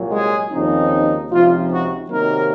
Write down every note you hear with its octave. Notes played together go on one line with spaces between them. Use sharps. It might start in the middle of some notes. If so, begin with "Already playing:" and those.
Already playing: C2 A#2 F#3
G#3 G#4
D#2 C#3 F3 C4 D#4
C#2 C3 F3 C4 D#4 F4
F#4
C3 D#3 F#3 A#3 C4 D#4 A#4